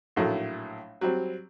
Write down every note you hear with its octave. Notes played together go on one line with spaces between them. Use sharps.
A#1 A2 F#3 A3
F#3 G3 C4